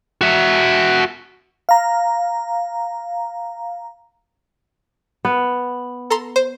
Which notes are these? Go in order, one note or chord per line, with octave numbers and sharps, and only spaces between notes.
F#4 E5
F5 A#5
B3
A4 A#5 C6
C5